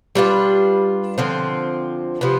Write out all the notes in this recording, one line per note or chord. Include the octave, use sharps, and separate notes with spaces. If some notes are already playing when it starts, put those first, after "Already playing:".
G3 D4 F4 B4
D3 F3 C4
C3 F3 B3